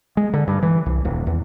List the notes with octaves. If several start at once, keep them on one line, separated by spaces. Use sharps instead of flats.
G#3
D3
G2
E3
C2
D#1
E2